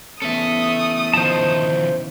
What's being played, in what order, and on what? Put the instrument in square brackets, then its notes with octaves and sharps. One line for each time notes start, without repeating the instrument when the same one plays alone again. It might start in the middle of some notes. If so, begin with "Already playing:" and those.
[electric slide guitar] E3 B3 C#4 [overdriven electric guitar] A4 E5 [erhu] D#6
[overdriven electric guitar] D#3 F3 [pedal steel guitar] C5 A5